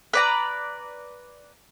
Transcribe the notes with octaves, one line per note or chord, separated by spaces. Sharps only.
B4 D5 A#5